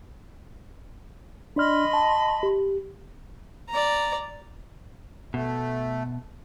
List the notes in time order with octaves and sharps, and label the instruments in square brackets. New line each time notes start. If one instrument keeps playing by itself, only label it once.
[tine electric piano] D4 D5 F6 [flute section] D#5 B5 C6
[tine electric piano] A5
G4
[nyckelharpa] D5 A#5
[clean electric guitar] B2 [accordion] A3